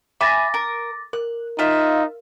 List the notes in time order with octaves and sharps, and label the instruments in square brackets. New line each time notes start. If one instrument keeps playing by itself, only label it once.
[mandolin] E5 G#5 B5 [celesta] D6 A6 A#6
[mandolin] A#4
[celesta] A#4 [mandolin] F#6
[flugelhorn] D#4 [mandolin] F4 E5